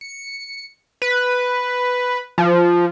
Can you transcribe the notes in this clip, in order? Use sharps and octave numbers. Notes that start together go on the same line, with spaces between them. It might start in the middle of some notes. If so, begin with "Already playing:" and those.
C#7
B4
F3